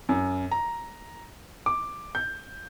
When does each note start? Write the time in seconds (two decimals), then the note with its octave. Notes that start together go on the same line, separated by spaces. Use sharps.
0.09 F#2
0.51 A#5
1.66 D6
2.15 G6